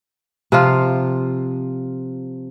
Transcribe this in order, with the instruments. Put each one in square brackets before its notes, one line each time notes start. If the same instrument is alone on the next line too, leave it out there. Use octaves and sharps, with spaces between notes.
[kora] C3 F3 F4